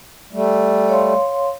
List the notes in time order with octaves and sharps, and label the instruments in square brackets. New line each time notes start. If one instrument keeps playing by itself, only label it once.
[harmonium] G3 A3
[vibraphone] C#5 F5 C6